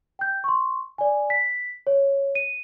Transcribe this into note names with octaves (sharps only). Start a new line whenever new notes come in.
G5 G6
C6 C#6
D5 G#5
B6
C#5
D#7